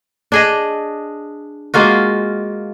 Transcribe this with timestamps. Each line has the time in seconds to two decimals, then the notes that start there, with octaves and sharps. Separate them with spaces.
0.32 D4 G#4 D#5
1.74 G#3 A#3 F4 F#4